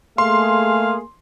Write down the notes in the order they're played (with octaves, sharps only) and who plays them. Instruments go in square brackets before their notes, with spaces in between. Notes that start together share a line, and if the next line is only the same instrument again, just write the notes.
[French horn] A3 [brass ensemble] A#3 G#4 [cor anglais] F5 [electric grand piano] C6